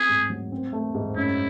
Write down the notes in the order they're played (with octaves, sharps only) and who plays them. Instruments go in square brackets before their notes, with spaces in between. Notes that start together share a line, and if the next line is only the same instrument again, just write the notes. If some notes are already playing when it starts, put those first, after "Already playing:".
Already playing: [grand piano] C4 [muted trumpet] G#4
[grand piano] G#2
F#3
C4
A3
G#2
[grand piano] F#2 [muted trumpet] E4